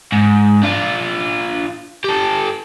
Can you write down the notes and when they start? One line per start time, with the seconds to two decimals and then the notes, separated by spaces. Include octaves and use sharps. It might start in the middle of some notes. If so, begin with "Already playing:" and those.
0.12 G#2
0.63 D4 F4
2.04 G4 A4